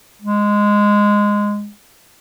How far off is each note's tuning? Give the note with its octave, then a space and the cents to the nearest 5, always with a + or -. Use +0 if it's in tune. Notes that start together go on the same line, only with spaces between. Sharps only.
G#3 -10